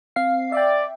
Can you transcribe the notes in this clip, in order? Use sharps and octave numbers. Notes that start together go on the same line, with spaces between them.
C4 F5 C7
D5 E5 G5